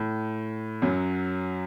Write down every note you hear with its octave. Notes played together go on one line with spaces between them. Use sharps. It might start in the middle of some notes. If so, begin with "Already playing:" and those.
Already playing: A2
F#2 F#3